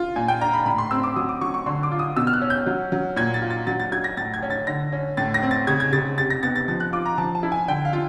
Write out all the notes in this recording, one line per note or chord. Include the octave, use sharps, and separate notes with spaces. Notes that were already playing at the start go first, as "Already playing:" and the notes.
Already playing: F4
A#2 G#5
G5
D4 A#5
B5
A2 B5
C6
C4 E6
D6
F#3 D#6
D6
F#3 C#6
C#6
D3 C6
D6
F4
D#6
B2 E6
F6
F#6
C#4
G6
F#3
F#3
A#2 G#6
A6
F4
A6
F#3 A6
A6
F#3 G#6
A#6
A2 A6
G#6
C#4
A6
D3 A#6
C#4
A2 A6
A#6
C4
A6
C#3 G#6
G#6
C#3 A6
C3 A6
A#6
B3 A6
A6
F3 A6
F#6
F4 D6
A#5
F3 A5
A5
E4
G#5
D3 G5
F5
F4